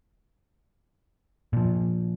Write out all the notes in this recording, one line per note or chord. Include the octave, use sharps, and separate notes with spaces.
A#2 F3